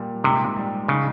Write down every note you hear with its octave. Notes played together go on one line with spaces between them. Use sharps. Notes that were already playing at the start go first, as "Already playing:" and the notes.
Already playing: A#2 G3
G#2 C3
G3
C#3 D#4